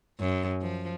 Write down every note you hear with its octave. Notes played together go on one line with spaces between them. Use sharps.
F#2
F3